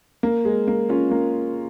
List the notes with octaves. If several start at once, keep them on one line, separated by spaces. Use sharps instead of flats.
A#3
G#3
A#3
C#4 F4
A#3